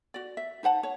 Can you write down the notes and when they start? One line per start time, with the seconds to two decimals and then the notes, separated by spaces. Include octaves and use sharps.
0.14 F#4 D5
0.37 E5
0.63 D#4 C5 F#5 A5
0.83 C#5